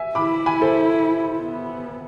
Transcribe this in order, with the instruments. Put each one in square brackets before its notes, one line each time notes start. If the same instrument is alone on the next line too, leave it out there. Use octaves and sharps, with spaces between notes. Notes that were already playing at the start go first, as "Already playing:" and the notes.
Already playing: [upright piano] E5 G#5
[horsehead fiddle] E4 [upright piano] B5 D6
[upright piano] G#5 B5
A4 C5
[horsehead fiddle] B3